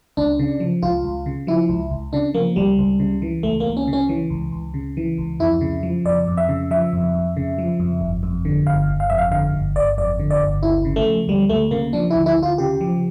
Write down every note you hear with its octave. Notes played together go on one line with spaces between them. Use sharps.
C#2 D4
C#3
F3
C#2 F4
C#2
C#3
F3 E4
C#2
C#2
C#3 D4
F3 A#3
C#2 G3
C#2
C#3
E3
C#2 A3
A#3
C#2
C#4
C#3
C#4
E3
C#2
C#2
C#3
E3
C#2
F2 E4
C#3
F3
F2 D5
F2
E5
C#3
F3 E5
F2
F2
C#3
F3
F2
G1
F2
D3
G1 F5
G1
F5
F2 E5
F5
D3 F5
G1
G1 D5
F2 D5
D3
D5
G1
D2 E4
C#3
A3
F3
D2 G3
D2 A3
C#3 A#3
F3 D4
E4
D2
E4
D2 F4
C#3 G4
F3